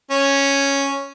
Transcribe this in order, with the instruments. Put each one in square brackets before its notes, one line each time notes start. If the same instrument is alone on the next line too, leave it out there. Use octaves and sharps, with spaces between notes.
[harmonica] C#4